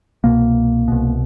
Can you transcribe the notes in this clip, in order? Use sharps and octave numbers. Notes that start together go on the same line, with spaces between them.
C2 B2 A#3
C2 B2